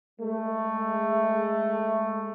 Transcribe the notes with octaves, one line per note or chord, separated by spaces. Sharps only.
G#3 A3